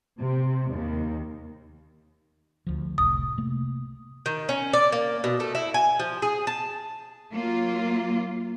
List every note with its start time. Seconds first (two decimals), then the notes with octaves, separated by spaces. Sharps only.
0.19 C3
0.71 D#2
2.67 D2 F3
2.98 F1 C2 A2 D#6
3.38 C3 A3 A#3
4.26 D#3
4.49 C#4
4.73 D5
4.92 A#3
5.24 B2
5.40 A3
5.55 E4
5.74 G#5
5.99 F3
6.22 G#4
6.47 A5
7.31 F#3 A#3 F4